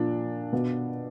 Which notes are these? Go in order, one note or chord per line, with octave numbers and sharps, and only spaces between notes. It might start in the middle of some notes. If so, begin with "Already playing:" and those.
Already playing: A#2 F3 D4
B2